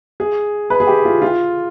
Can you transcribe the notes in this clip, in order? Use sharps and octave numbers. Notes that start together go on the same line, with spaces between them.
G#4
B4
G#4
G4
F4
F4